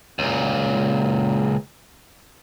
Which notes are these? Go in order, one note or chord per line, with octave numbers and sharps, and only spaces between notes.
C#2 A#2